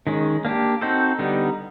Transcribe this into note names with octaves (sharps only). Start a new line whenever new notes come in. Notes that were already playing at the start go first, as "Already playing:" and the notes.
D#3 G#3 C#4
A#3 D4 G4
C4 D#4 F#4 A4 C5
D3 G3 B3 D#4